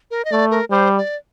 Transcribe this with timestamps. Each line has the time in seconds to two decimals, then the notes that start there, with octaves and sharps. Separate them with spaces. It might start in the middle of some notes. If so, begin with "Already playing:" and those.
0.11 A#4
0.25 D#5
0.31 A3 D5
0.51 A#4
0.70 G3 C5
0.98 D5